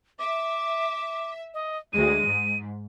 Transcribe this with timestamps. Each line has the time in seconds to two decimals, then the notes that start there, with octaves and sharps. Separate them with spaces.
0.19 E5 D6
1.54 D#5
1.93 D2 G#3 D#7
2.25 G#2